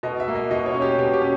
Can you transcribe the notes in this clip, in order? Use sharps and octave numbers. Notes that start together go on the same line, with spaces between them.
B2 D#5
E5
A#3
D#5
B2 D#5
C#5
C#4
G4
B2 G4
G4
C#4